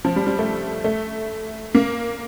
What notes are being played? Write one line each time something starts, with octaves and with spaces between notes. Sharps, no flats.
F3
G3
G3
A3
A3
A#3